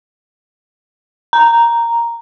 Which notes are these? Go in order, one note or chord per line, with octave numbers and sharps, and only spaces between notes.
A#5